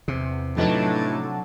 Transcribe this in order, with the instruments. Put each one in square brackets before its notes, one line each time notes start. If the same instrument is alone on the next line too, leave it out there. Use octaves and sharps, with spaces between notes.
[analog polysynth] E2 [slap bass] C3
[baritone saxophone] A2 [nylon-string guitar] F3 D#4 B4 [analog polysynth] F#3 D4 A4